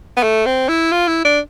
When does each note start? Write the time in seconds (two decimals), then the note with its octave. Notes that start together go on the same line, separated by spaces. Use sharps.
0.17 B3
0.23 A3
0.46 C4
0.69 E4
0.92 F4
1.08 E4
1.25 D4